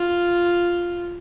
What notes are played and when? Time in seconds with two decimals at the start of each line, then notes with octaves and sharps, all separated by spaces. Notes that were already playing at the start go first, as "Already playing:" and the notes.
Already playing: F4